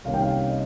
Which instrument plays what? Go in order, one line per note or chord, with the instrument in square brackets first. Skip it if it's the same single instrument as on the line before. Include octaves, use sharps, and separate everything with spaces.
[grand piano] C2 C3 D#3 A#3 C#4 F5
G5
F5
D#5